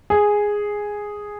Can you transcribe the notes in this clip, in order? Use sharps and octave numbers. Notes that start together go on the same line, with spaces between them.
G#4